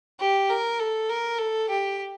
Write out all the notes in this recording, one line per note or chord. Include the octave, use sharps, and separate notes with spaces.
G4
A#4
A4
A#4
A4
G4